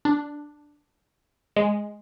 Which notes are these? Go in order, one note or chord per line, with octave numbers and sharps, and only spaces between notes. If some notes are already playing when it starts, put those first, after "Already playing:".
D4
G#3